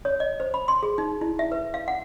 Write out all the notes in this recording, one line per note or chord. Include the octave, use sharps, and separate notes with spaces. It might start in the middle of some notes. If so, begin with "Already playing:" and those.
C#5
D#5
C5
B5
C6
G#4
D#4
E4
E5
B4
F5
F#5